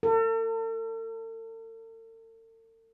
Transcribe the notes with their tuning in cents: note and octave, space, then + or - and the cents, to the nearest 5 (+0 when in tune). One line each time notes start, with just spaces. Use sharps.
A4 +45